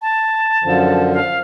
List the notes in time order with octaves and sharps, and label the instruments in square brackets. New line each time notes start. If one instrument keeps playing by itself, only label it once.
[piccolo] A5
[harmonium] F#2 D3 F3
[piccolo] F5